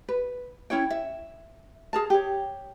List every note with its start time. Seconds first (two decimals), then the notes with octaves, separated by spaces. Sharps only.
0.09 B4
0.70 C#4 E4 C#5 G5
0.91 E5
1.93 G#4 A#4 A5
2.10 G4 C#5